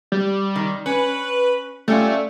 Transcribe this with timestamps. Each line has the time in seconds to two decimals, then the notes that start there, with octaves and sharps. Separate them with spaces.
0.12 G3
0.56 D#3
0.86 C#4 B4
1.88 G3 A3 C#4 F4